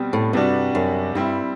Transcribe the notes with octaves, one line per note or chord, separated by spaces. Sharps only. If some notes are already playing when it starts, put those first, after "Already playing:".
Already playing: B2 G3 C4
A2
G2 C3 G3 D4 F#4
F#2
G2 G3 C4 E4